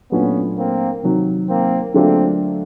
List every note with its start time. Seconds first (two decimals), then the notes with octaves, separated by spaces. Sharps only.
0.11 A#2 F#3 A3 B3 C#4 D4 F4
0.57 A#3 C4
1.03 C3 D#3 F#3
1.49 A#3 C4
1.94 D3 F#3 A3 A#3 C4 D4 F4